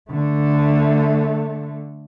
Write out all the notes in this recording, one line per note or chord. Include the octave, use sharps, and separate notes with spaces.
D3 A3